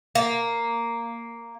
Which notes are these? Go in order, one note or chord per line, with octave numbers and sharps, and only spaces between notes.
A#3